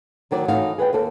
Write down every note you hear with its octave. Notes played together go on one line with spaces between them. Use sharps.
D2 D#3 F#3 D5
A2 E3 D#4 F#4 D#5 F5
G#4 B4 D#5 G5
D#2 A#3 A4